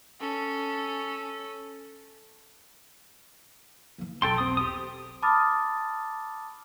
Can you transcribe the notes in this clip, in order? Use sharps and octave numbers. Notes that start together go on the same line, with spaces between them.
C#4 A4
E3 A#3
E1 B1 A4 G5 C6
C4 D#6
G4 D#6
A5 B5 D6 D#6 F6 A6